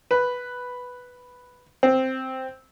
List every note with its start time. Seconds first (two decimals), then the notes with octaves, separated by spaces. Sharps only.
0.11 B4
1.83 C4